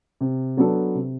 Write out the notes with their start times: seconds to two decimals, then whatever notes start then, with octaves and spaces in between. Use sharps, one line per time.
0.21 C3
0.57 F#3 B3 D4 A4
0.95 C3